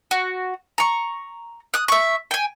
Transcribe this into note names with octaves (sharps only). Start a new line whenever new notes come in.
F#4
A#5 C#6
D#6 F#6
E5 C#6
G5 G#5